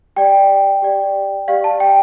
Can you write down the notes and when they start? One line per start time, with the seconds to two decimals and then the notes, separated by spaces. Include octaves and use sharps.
0.16 G4 D5 G5
0.82 G4 D5
1.48 G4 D5 F5
1.64 A5
1.80 G5